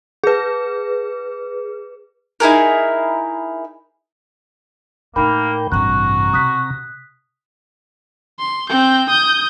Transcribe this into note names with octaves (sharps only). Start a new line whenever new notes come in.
G#4 B4
D#4 E4 G#4 A#4
A2 A3 A#3 D#4 A#4 G5 B5
A1 G2 C3 F#4 A#5 F#6
B2 D#6 F#6 B6
C6
C4 G6
D#6 G6